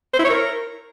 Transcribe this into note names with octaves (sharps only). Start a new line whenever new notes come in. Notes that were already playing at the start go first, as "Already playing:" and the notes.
C5
E4
C#5
A#4